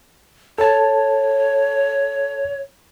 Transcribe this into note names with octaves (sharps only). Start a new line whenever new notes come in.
A4 C#5 A5